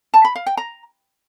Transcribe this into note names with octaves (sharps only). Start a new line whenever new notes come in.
A5
B5
F5
G5
A#5